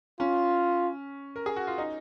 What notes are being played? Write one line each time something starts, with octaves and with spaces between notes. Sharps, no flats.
C#4 F4
A#4
G#4
F#4
F4
D#4